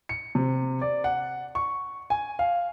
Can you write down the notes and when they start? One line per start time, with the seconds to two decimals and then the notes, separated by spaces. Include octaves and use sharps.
0.09 C#7
0.35 C3
0.81 D5
1.04 F#5
1.55 C#6
2.10 G#5
2.39 F5